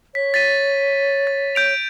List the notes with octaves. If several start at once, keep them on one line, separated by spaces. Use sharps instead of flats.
C#5 B6
A6 B6 D#7
A6
G6 D7 F7